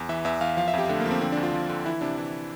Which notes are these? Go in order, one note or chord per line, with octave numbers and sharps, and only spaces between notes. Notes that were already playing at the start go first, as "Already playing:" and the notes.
Already playing: E2
E3 E5
E2 E5
E2 F5
F3 F5
E5
F2 G4
D3 A3
A#3
F3
C4
D3 C4
D4
D2
F4
F3
D3
E3 E4
C3 D4
E3